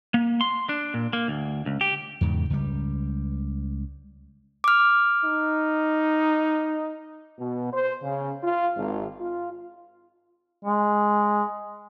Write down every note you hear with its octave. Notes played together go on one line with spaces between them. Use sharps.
A#3
C6
D4
A#2
A#3
D2
C#2
G4
E2 G#2 C#3
C#2 G3
D6 F6
D#4
B2
C5
C#3
F4
G#1
F4
G#3